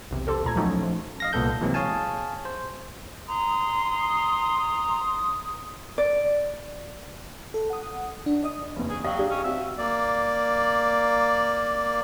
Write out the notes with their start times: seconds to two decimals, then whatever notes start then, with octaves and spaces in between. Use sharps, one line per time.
0.11 B1 E2 C3
0.27 G4 A4 C5
0.44 D2 A#2 A#5 G#6
0.56 F3 F#3 A3 C#4 D#4 F#4
0.83 F3
1.20 D#5 F5 A#6
1.33 C2 A#2 B3 A4 G6
1.61 C3 E3 F#3 G#3 A#3 C4
1.74 G#4 C#5 F5 G#5 A5
2.45 C5
3.28 A#5 C6 D#6
5.98 D5
7.54 A4
7.70 F#5 D#6
8.26 D4
8.43 D5 D#5 D#6
8.76 F#1 E2
8.89 G#4
9.04 F#3 D#5 F5 G5
9.18 D4 G4 G#4
9.30 C#4
9.44 C4 F#4 E5
9.78 A#3 D5